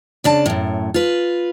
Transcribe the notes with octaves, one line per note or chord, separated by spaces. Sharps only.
C#3 D4 A5
F#2 A2
F4 B4